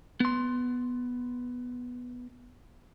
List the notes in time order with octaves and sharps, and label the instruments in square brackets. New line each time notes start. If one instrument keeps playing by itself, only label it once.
[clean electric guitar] B3 C6